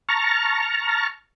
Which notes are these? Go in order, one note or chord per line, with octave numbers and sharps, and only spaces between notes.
A5 A#5 C#6 F6